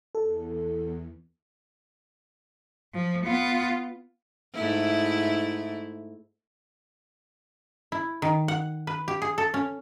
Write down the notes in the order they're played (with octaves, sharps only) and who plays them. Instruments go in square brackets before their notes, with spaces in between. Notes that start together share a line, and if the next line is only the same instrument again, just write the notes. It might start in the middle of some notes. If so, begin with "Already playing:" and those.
[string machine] E2 [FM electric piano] A4
[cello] F3
B3 F4
[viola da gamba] G#2 A3 E4
[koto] E4
D#3
F#5
B4
G4
G#4
A4
C#4